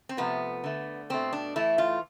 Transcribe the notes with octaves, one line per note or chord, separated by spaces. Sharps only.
C4
C3 F3 A3 B3
D3 A3
B2 A3 C4
D4
A2 E3 A3 E4
F4